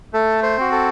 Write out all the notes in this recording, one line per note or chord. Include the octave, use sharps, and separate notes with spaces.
A3 A4
C5
C4 F#4
A4